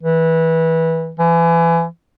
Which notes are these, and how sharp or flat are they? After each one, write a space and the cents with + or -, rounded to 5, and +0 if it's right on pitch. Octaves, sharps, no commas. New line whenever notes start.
E3 -20
E3 +30